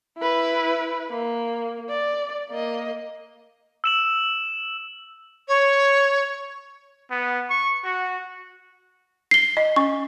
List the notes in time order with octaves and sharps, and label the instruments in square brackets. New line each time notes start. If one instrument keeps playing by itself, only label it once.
[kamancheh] E4 B4
A#3
D5
A#3 D#5
[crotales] E6 E7 F#7
[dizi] C#5
[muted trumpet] B3
C#6
F#4
[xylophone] C7 G7
[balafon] D#5
[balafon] C#4 [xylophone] C#6